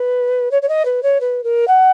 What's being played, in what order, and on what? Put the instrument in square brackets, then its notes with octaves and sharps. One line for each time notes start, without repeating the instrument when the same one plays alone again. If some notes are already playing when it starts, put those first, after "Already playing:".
Already playing: [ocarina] B4
C#5
C#5
D#5
B4
C#5
B4
A#4
F#5